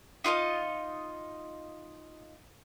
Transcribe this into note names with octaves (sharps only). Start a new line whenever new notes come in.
D#4 F4 A4 D#5